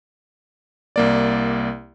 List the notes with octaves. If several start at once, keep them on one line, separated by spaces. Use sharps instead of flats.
C2 A#3 D5